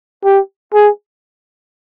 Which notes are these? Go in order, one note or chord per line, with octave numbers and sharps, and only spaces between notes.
G4
G#4